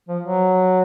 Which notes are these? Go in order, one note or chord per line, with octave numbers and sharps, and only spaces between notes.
F3
F#3